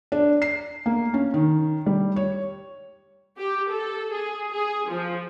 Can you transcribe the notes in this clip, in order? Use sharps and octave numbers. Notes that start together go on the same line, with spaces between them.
D4
C7
A#3
C#4
D#3
G3
C#5
G4
A4
G#4
G#4
F3